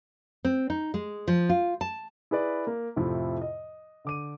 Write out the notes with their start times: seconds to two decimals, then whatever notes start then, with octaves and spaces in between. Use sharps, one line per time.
0.45 C4
0.70 D#4
0.94 G#3
1.28 F3
1.49 F4
1.81 A5
2.31 E4 G#4 B4 D5
2.67 A#3
2.96 F2 A2 C3 F3 E4
3.42 D#5
4.05 D3 D6 D#7